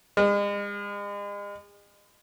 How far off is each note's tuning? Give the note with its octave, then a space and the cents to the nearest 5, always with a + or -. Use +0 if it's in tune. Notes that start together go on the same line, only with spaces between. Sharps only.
G#3 -40